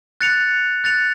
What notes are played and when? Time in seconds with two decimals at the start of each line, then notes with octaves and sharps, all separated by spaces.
0.21 F#6 A6 C#7 F7
0.84 F#6 A6 C#7 F7